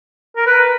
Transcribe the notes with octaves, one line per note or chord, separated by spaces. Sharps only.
A#4
B4